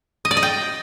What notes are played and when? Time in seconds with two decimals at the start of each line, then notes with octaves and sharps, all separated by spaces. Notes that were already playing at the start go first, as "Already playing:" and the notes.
0.25 D#5
0.31 D5
0.37 D#5
0.43 G5